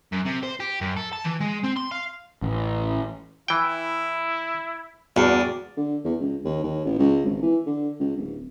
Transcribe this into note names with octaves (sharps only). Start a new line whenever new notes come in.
F#2
C3
C5
G4
F#2
A4
A5
E3
G#3
C4
C6
F5
A1
E3 E4 G5
E2 G2 F#4 D5
D3
E2
C#2
D#2
D#2
A1
C#2
G#1
E3
D3
C#2
D1